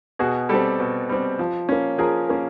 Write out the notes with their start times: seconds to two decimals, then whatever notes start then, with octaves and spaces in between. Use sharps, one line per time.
0.19 B2 F#4 G#4
0.49 G3 C4 G4 A4
0.80 B2
1.09 G3 C4
1.39 F3
1.69 A#3 C#4
1.98 F3 G#4 A#4
2.29 A#3 C#4